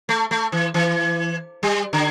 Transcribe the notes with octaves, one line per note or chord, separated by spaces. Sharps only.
A3
A3
E3
E3
G3
D3